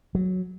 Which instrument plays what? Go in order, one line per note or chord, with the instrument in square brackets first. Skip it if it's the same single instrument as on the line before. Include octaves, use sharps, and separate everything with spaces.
[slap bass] F#3